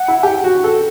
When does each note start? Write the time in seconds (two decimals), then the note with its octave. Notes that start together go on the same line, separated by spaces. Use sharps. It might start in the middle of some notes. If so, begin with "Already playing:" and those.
Already playing: F#5
0.08 E4
0.23 G4
0.44 F#4
0.64 A4